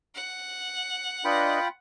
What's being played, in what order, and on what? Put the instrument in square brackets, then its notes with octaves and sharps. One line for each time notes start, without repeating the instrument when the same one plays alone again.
[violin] F#5
[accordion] D4 B4 D#5 [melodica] F4 G5 B5